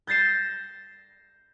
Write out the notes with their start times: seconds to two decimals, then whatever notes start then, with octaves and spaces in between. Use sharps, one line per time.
0.07 G6 A6 A#6 C7 E7